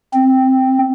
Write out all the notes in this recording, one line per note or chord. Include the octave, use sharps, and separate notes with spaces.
C4